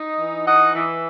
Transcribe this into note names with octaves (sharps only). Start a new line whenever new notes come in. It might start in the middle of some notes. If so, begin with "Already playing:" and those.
Already playing: D#4
E3
D#4 D#5 F#5
E3